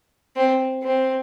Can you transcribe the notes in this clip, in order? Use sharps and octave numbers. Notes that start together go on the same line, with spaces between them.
C4
C4